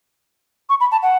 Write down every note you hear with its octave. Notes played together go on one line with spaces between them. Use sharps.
C#6
B5
A5
F#5